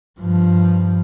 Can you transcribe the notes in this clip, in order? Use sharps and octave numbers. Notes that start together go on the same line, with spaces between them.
G2 F3